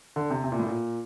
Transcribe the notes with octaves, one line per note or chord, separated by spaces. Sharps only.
D3
C3
C3
A#2
A2
A#2